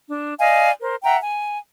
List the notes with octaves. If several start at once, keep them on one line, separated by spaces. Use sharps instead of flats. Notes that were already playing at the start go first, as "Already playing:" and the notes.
D4
D5 D#5 F5 G#5
A#4 C5
E5 F#5 G5 A#5
G#5